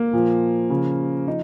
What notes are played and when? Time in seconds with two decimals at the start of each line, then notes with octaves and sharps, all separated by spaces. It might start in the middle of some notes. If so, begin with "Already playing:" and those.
Already playing: A#3
0.13 A#2 F3
0.70 C#3 F3
1.27 F3 D#4